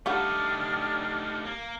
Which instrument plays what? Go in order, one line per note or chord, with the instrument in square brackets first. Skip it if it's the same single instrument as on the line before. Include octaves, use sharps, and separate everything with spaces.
[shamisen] G3 F4 F#5 [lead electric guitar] A3 D#4 [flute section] D4 G4 F6
[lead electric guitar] A#3